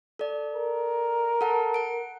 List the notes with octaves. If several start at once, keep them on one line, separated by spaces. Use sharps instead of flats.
A4 D5
A#4
A4 F#5 A5
F#5 D7